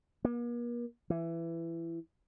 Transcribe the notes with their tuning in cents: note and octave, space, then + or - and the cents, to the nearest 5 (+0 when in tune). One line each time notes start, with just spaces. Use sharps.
A#3 +45
E3 +15